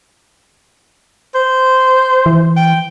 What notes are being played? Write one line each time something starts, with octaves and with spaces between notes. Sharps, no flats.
C5
E3
G5